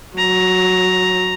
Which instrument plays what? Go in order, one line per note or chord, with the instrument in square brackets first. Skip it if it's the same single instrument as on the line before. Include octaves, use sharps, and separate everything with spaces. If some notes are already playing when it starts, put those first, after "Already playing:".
[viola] F#3 [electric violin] A#5